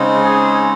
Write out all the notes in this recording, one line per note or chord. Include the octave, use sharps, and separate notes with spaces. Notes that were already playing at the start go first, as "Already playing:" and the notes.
Already playing: C#3 G#3 C4 D#4
G#4